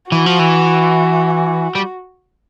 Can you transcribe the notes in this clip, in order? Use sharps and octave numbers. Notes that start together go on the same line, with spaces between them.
E3 F#4
F3
E3
G3